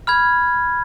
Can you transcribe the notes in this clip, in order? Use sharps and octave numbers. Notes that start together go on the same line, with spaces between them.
B5 F6 G#6